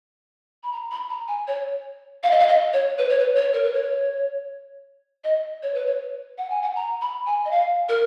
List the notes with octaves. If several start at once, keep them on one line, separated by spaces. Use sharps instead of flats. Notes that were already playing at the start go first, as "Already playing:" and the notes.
B5
A#5
B5
A#5
G#5
C#5
F5
D#5
F5
D#5
C#5
B4
C#5
B4
C#5
A#4
B4
C#5
D#5
C#5
B4
C#5
F#5
G#5
F#5
A#5
B5
G#5
D#5
F5
A#4